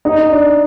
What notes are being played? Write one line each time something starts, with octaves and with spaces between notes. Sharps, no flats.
D#4
D4